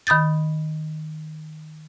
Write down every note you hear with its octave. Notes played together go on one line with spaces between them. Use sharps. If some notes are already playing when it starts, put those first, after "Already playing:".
D#3 B5 D#6 G6 A6